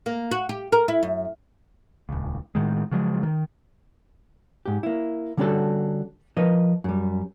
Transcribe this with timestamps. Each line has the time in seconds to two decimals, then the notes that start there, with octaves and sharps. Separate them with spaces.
0.06 A#3
0.31 F#4
0.49 G4
0.72 A#4
0.88 E4
1.03 F#2
2.09 D#1 C#2
2.55 A2 D#3 G#3
2.92 C#3 F3 F#3 G#3
3.23 D#3
4.66 G#2 G4
4.83 A#3 E4
5.37 D3 G3 C#4 D4 F#4 A4
6.37 F3 A#4 B4 D#5
6.84 F#2 G3